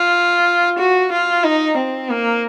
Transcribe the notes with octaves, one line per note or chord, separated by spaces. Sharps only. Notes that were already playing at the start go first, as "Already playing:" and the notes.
Already playing: F4
F#4
F4
D#4
C4
A#3